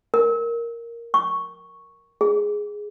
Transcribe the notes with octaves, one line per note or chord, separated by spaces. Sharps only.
A#4
C#6
G#4